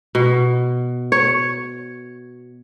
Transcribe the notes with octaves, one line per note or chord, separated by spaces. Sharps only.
B2
C#5